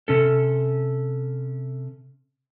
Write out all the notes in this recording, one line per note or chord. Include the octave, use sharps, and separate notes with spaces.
C3 C#4 A4